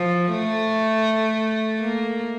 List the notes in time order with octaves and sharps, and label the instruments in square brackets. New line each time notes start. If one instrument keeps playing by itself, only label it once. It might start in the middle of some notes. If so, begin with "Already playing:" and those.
Already playing: [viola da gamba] F3
A3
A#3